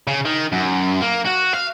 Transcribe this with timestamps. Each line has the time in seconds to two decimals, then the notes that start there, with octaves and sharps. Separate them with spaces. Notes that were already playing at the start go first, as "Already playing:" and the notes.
0.07 C#3
0.25 D#3
0.53 F#2
1.02 A#3
1.26 F#4
1.54 F5